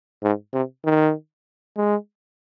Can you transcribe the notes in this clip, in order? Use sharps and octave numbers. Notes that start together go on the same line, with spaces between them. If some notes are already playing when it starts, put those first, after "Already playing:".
G#2
C3
D#3
G#3